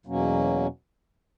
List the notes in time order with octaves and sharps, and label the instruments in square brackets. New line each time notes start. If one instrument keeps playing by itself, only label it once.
[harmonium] E2 B2 F#3 A#3 C#4